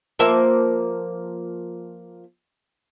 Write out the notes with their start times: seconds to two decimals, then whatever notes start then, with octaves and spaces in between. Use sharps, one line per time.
0.19 F3 A#3 E5